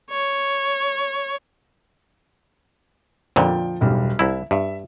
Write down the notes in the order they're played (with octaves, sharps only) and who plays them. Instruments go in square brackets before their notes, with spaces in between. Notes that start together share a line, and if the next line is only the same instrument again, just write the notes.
[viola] C#5
[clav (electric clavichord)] F2 A#2 D3 [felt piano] F3 G5
[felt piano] E1 B1 G3
[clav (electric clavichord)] C2 E4 [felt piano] E5
[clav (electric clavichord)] G2 [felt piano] E5